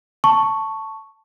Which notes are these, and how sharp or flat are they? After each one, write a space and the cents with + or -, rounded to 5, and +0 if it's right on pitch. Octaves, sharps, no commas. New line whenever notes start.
A5 +5 C#6 +0